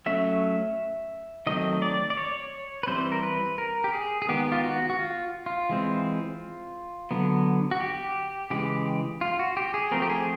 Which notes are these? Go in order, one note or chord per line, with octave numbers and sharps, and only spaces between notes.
F#3 A3 C#4 E5
D#3 F#3 A3 C4 D#5
D5
D5
C#5
B4
E3 G3 C4 C5
A#4
B4
A#4
G4
G#4
G#4
D#3 G#3 B3 G4
F4
F#4
F#4
F4
F4
E3 G#3 C4
D3 F#3 B3
F#4
G4
C#3 E3 G#3 G4
F4
F#4
G4
G#4
F3 A3 C4 A#4
G4
G#4